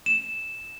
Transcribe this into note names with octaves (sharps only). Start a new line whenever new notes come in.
E7